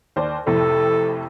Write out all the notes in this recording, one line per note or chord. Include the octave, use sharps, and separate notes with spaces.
D#2 C5 D5
F2 A2 C3 A4